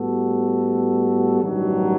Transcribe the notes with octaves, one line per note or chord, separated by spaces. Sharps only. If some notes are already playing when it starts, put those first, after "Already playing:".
Already playing: A2 G3 B3 F#4 A4
A1 G2 D#3 F#3